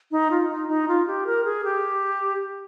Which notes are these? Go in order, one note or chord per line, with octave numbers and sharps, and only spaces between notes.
D#4
F4
D#4
D#4
F4
G4
A#4
G#4
G4